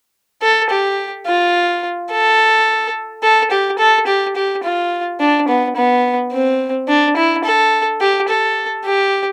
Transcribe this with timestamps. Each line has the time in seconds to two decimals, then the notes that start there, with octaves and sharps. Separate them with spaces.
0.42 A4
0.70 G4
1.26 F4
2.11 A4
3.23 A4
3.51 G4
3.79 A4
4.07 G4
4.36 G4
4.64 F4
5.20 D4
5.48 B3
5.76 B3
6.32 C4
6.88 D4
7.16 E4
7.45 A4
8.01 G4
8.29 A4
8.85 G4